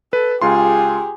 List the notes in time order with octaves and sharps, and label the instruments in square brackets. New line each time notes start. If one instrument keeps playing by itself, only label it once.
[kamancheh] A4 [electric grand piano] B4
[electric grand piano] C#2 F4 C6 [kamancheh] G4 G#4